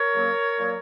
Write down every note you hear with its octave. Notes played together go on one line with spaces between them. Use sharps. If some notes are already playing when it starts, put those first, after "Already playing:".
Already playing: A#4 C#5
C#3 F#3 A#3
A#2 F#3 A#3